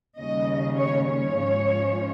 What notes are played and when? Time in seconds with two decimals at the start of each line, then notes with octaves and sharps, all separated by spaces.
0.19 D#2 C#3 G3 C#4 D#5
0.78 C#5
1.08 C#5
1.38 G#2 F3 G#3 C#4